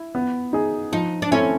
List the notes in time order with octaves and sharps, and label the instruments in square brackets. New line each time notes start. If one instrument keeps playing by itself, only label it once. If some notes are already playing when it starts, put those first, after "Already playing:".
Already playing: [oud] E4
[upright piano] B3
D#4 G#4
[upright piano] F3 [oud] D#4
[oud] D4
[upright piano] A3 C4 E4 [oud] C#4